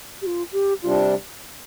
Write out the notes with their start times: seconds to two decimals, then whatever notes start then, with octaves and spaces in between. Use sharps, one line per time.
0.22 G4
0.26 F4
0.52 G4
0.82 C3 G3 D4 F4